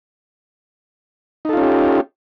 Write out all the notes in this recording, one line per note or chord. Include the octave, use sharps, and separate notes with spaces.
C#4 D#4 F4 G4 A4